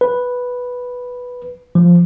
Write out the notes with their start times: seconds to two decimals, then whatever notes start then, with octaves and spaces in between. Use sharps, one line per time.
0.01 B4
1.75 F3